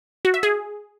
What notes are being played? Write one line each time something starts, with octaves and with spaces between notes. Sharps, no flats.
F#4
E5
G#4